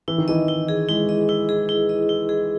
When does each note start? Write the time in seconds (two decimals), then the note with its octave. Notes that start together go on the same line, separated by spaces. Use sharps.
0.08 E3 E4
0.18 D#3
0.28 E3 D#5
0.48 E4
0.68 G#4
0.89 G#3 E4
1.09 D#5
1.29 E4
1.49 G#4
1.69 E4
1.89 D#5
2.09 E4
2.29 G#4